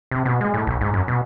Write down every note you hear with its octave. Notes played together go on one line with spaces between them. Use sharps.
C3
B2
G#3
A2
B1
G#2
F#2
B2